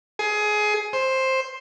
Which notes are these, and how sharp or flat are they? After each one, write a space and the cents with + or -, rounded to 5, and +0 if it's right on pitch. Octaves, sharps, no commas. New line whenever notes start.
G#4 +20
C5 +10